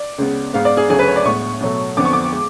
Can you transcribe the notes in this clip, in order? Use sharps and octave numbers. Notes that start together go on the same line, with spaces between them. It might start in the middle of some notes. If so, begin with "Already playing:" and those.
Already playing: D5
C#2 C#3 G#3 B3
G#2 G#3 B3 F5
D5
G#4
D2 C#3 F#3 A3 G#4
B4
C#5
D5
A2 G#3 B3 C#6
B2 F#3 A3
F2 D3 F3 B3 D6
C#6
D6
G#3